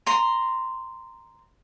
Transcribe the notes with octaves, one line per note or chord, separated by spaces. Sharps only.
A#5 C6